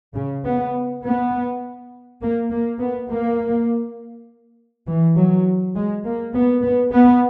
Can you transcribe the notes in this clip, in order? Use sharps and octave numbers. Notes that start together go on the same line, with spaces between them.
C#3
B3
B3
A#3
A#3
B3
A#3
E3
F#3
G#3
A#3
B3
B3
B3